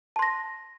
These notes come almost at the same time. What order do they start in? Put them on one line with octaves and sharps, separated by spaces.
A5 C6 A#6